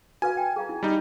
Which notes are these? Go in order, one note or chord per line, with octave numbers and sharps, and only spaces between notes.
F#4 B4 F5 G#5
G5
G#4 F5 A#5
E4
G3 D#4